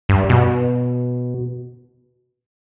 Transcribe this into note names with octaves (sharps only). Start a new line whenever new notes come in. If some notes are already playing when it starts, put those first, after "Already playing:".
G2
B2